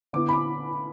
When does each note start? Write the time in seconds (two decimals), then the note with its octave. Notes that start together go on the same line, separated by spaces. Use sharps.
0.13 D3 B3 E4 D6
0.29 B5
0.33 D6